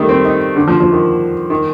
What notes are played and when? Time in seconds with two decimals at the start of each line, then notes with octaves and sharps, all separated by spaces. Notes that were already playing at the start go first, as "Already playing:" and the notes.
Already playing: D#3 G3 A3
0.09 C4
0.25 D#4
0.56 D3
0.68 F3
0.80 F3
0.92 D#3
1.50 D#3